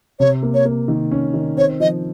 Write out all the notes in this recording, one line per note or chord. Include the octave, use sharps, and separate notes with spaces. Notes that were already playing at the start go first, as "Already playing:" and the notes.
C3 C#5
A#3
C#5
A#3
D#3
C#4
D#3
C4 C#5
F3 D#5